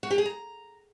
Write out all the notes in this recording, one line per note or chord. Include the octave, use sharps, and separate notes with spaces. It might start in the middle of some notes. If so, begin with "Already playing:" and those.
F#4
G4
G#4
A#5